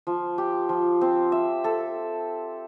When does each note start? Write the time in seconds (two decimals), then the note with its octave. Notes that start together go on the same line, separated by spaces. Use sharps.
0.07 F3
0.38 G4
0.69 F3
1.01 C4
1.32 E5
1.64 A4